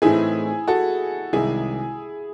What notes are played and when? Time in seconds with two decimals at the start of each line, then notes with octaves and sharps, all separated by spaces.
0.02 A2 E3 A3 C4 D#4 E4 G#4
0.68 F#4 A4
1.33 C2 C3 D#3 G#3 E4 G#4